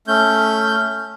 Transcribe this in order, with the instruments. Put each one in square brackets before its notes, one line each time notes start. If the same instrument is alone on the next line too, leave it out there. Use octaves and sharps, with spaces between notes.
[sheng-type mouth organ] A3 C#4 G6